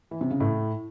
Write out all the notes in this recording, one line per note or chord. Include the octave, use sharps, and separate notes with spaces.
E3
C3
C#3
A2